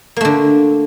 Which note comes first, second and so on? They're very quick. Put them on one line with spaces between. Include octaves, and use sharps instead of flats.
A#3 A3 D3